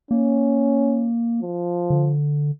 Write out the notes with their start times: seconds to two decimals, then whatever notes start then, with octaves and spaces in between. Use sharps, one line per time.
0.11 A#3 C#4
1.42 F3
1.90 D3